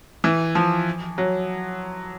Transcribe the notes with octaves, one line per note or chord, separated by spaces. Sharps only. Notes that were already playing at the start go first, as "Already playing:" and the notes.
E3
F3
F#3